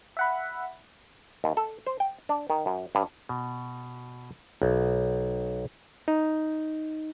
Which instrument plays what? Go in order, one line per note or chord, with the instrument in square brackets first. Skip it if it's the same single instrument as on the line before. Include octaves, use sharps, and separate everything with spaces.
[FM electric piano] E5 F#5 B5
[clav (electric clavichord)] D#2
A4
C5
G5
D4
D#3
F#2
G2
B2
B1
[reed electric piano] D#4